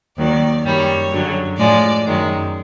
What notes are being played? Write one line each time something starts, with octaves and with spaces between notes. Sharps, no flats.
D#2 D#3 F#3 D5
F#2 D#3 G3 C#5
F#2 D3 F#3
A2 F3 G#3 D5
F#2 D#3 G#3